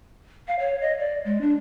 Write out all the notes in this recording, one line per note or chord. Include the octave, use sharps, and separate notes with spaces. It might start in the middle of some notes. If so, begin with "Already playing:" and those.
F5
C#5
D#5
D5
G#3
D4